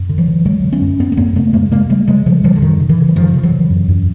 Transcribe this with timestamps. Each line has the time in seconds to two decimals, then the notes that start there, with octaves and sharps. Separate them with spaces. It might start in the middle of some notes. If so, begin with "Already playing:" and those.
Already playing: F#2
0.09 D3
0.18 E3 F#3
0.28 D3
0.45 D3 F#3 G#3
0.64 D3
0.73 B3 C#4
0.81 F#2
0.99 F#2 B3 C#4
1.12 B3
1.17 F#2 A#3 C4
1.35 C#3 A3 B3
1.53 F#2 G#3 A#3
1.71 C#3 G#3 A#3
1.89 C#3 G3 A3
2.07 C#3 F#3 G#3
2.26 C#3 F3 G3
2.44 C#3 F3 G3
2.55 D3
2.62 F#2 D#3
2.80 C#3
2.89 D3 E3
2.98 C#3
3.09 F#3
3.16 F#2 D#3 F3
3.34 C#3
3.43 E3 F#3
3.52 C#3
3.70 F#2
3.88 F#2